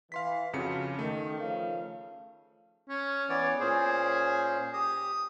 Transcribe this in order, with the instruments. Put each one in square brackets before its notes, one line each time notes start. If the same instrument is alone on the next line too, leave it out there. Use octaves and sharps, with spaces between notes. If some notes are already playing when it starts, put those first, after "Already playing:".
[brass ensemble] E3 [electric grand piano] F5 C6 B6
[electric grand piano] F2 C#3 C#7 [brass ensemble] F4 F#4
[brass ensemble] D#3 [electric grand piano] A3
[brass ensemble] C#3 F3 F5
[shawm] C#4
[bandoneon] E3 B3 C#5 [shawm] D5
[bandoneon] A#2 C#4 C5 [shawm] G#4
[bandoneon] G4 [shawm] D#6